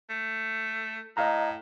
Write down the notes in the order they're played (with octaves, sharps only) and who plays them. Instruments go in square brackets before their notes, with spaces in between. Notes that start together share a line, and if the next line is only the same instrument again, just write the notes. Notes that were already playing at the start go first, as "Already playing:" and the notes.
[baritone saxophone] A3
[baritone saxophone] A2 [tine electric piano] D#5 F5 A#5